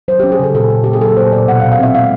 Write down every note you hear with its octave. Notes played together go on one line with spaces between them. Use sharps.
F#3 C5
G4
C#4
G#4
C#3 A4
A#2 A4
A#2
A#3 G4
G#4
F#3 A4
A#2 C5
A#2 D5
B2 F#5
F5
B2
F5
C4 E5
G#3 F5